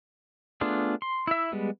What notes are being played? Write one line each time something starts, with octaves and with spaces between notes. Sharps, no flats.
A3 B3 D4 F4 G#4
C6
E4 E5
G3 G#3 B3